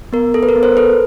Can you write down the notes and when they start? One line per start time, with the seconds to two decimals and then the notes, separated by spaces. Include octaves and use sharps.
0.13 B3 A#4
0.34 A4
0.43 B4
0.49 A#4
0.55 B3
0.63 A#4 C5
0.77 A4 B4